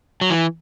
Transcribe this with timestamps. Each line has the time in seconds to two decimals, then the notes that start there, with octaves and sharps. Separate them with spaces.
0.21 F#3
0.30 E3